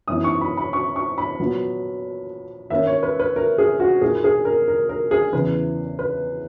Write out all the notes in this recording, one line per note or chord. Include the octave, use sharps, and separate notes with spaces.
F#2 E3 B3 D#4 D#6
C#6
B5
B5
C#6
C#6
B5
A#2 F#3 B3
D#3 A#3 C#4 E5
C#5
B4
B4
A#4
G#4
F#4
A#2 A#3 D#4 G#4
G#4
A#4
A#4
A#4
G#4
E2 C#3 E3 B4
B4